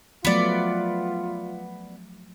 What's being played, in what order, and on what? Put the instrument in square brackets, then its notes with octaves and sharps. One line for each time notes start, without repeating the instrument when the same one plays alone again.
[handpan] F3 F#3 A3 [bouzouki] B3 D5 [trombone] F4